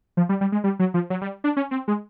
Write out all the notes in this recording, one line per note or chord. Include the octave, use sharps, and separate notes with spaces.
F3
G3
G3
G#3
G3
F#3
F3
F#3
G3
D4
C#4
C4
G#3